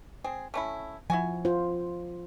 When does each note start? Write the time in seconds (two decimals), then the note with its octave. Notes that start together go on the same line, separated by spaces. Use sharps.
0.24 C4 G#4
0.54 A3 C#4 E4
1.10 F3 E4 F#4 G#5
1.45 F4 C5